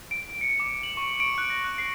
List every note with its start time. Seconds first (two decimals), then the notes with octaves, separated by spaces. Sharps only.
0.11 D7
0.41 C#7
0.60 D6
0.83 F#7
0.97 C#6
1.20 D7
1.38 F#6
1.50 A#6
1.64 F#6
1.78 C7